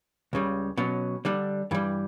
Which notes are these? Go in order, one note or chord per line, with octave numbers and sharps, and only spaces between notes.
C#2 C#3 G3
B2 F#3 C#4
D3 G3 D4
G2 E3 G3